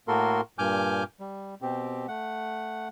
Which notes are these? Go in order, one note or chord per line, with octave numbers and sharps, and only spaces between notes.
A2 A#3 F#4 A4 A#4 C6
G2 A#2 G#5 D6 F6 G6
G3
B2 C4 G4
A3 F#5